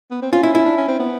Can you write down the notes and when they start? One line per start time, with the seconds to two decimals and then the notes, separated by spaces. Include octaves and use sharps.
0.11 B3
0.22 C4
0.32 C#4 F4
0.43 E4
0.55 E4
0.65 D4
0.77 C#4
0.88 C4
1.00 B3